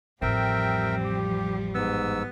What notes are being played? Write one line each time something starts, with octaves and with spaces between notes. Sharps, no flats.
A1 F2 F3 G3 C4 A#4 E5 G5
G4
G#2 B3 E6